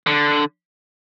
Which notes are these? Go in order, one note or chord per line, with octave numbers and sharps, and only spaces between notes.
D3